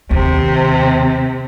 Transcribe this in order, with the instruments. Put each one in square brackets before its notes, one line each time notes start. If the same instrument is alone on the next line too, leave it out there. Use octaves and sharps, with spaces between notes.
[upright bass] D#2 [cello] C3